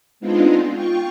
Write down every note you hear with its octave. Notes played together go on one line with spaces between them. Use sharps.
G#3 B3 C4 D4 D#4 F4
F4 G5 C#6